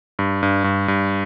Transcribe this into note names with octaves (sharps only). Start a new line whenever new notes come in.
G2
G2
G2
G2